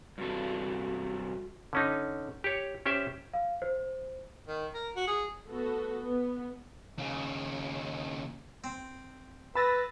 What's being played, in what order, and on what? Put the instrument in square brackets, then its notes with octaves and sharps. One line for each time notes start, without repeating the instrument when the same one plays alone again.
[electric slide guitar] G2 C3 A4 [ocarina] F#4
[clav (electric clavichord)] D3 C#4 D#4
G4 C#5
C#4 G4 C5 E5
[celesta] F5
C5
[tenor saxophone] D#3
A#4
F#4
G#4
[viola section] A3 B3 F#4 A4
B3
[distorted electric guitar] D#2 C#3
[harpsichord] C4
[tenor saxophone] B4 [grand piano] B5 [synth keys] E6 A6 A#6